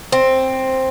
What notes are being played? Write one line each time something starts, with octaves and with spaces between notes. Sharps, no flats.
C4